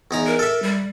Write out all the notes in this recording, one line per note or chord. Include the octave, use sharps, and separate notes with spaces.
E2 D#4 A#5
A#4
A4 E5
G3